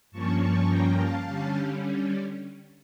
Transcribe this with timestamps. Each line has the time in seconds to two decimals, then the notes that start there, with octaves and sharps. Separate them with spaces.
0.11 G2 F3 A#3 C#4 A5 C#6
0.39 A5 C#6
0.68 G5 A#5
0.97 F5 A5
1.26 D3 G3 C#4